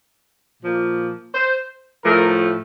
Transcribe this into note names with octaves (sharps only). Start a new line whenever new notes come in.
A#2 F3 A#3
C5
A2 F3 A3 A#4